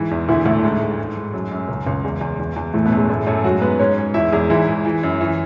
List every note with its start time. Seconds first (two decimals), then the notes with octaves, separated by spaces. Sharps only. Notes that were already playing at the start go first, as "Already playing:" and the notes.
Already playing: G#2 E3 E4
0.11 E2
0.28 D2 E3 E4
0.45 D2 A2 A3
0.64 G#2
0.81 G#2
0.98 G#2
1.17 G#2
1.33 F#2 F#3
1.51 F#2
1.69 C#2
1.87 C#2
2.04 E2 G#3
2.21 E2
2.39 E2
2.56 E2
2.74 A2 E3 A3
2.85 B2 B3
2.92 F#2
2.97 G#3
3.09 F#2 A2 A3
3.27 F#2 A2 A3
3.44 G#2 F#3 F#4
3.61 G#2 B3 B4
3.79 G#2 C#4 C#5
3.98 G#2
4.14 E2 E4 E5
4.32 E2 G#3 G#4
4.50 G#2 E3 E4
4.68 G#2
4.85 E3
5.03 F#2
5.21 E3